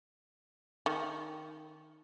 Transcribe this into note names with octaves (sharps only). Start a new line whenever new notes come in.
D#3